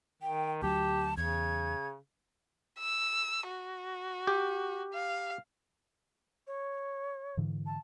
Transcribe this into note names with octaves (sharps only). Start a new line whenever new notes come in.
D#3 G5
D2 F#3 G4 A5
E2 C#3 G#6
E6
F#4
G4
F5
C#5
G#2 D3 E3
A5